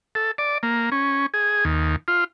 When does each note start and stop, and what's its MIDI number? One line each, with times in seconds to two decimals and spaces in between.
0.15 0.31 69
0.38 0.58 74
0.63 0.90 58
0.92 1.26 61
1.34 1.65 68
1.65 1.96 39
2.08 2.24 65